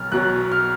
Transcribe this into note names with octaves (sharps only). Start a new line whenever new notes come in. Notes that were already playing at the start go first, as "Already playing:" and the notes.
Already playing: B1 B2 F#3 F6
B1 B2 F#3 F#6
F6